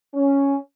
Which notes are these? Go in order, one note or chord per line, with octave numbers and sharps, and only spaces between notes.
C#4